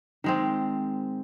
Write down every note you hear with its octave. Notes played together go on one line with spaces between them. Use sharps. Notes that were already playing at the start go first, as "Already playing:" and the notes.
D#3 G#3 C4